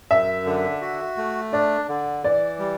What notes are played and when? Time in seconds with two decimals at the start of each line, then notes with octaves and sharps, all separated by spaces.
0.11 F#2 E5
0.46 D3
0.81 F#4
1.17 A3
1.53 D4 D5
1.89 D3
2.24 E3 D5
2.59 G3